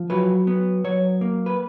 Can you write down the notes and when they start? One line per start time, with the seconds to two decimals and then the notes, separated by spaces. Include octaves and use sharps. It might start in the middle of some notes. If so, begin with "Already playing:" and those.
Already playing: F3
0.10 F#3 B4
0.47 B3
0.84 F#3 C#5
1.21 A#3
1.46 B4